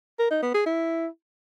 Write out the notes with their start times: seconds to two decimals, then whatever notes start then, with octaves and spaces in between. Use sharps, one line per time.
0.19 A#4
0.31 D#4
0.43 B3
0.54 G#4
0.66 E4